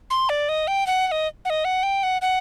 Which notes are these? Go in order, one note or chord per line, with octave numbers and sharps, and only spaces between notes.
C6
D5
D#5
G5
F#5
F#5
D#5
F#5
D#5
F#5
G5
F#5
F#5